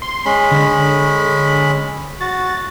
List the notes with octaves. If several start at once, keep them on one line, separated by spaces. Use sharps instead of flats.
C6
G#3 C#4 B5
D3
F#4 A6